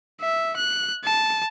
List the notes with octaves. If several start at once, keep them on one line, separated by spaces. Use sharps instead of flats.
E5
F#6
A5